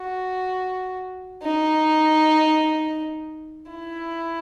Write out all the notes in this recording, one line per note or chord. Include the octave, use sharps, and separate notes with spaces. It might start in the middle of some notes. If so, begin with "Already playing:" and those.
Already playing: F#4
D#4
E4